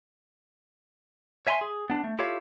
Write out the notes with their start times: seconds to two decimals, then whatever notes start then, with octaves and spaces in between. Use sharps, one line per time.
1.47 C#5 E5 G#5 A#5 C6
1.61 G#4
1.90 B3 D4
2.04 A3
2.19 E4 F4 G4 A4 C#5 F5